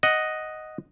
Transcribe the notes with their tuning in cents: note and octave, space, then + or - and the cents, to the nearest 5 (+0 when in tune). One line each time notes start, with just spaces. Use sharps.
D#5 +0 F#5 +0